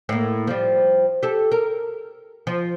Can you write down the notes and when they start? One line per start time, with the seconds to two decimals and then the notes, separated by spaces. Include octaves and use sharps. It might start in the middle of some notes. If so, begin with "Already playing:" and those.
0.09 A2 A#3
0.47 F3 G3
1.23 G4 A4
1.52 A#4
2.47 F3